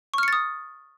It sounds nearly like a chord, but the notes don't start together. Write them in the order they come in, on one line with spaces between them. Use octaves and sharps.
C#6 F6 C#7 A6 D#6